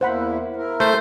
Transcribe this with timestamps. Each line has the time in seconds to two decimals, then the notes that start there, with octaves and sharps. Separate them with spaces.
0.01 E2 A#3 E4 C5 F#5 B5
0.56 E4 A#4
0.80 A3 C5